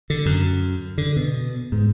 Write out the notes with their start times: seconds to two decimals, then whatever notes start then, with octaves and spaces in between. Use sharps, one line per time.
0.10 D3
0.26 F#2
0.98 D3
1.17 B2
1.72 G#2